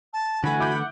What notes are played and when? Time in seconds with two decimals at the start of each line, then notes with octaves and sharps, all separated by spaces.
0.13 A5
0.44 D3 E3 A3 F#4 F#5 G#5 B5
0.59 E4 B5 D6 G6
0.75 F#5